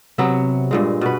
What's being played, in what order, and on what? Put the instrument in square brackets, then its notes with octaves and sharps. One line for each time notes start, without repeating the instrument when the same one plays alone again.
[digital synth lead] C3 [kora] F#3 B3 E5
[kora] G2 A#2 G#3
[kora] B2 B4 [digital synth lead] F#4